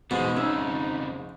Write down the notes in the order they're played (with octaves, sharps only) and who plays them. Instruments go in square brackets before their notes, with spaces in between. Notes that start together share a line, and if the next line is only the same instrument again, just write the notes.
[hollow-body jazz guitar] E2 B2 [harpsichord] G#2 [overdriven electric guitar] F3 G#3
[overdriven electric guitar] F2 C#3 [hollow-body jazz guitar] C#4 E5 [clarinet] D#4